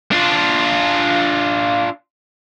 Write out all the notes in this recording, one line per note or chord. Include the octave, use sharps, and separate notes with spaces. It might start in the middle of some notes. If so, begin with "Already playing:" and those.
D4 F4